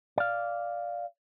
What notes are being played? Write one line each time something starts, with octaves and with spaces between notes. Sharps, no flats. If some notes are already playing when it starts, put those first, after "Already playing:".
D5 F5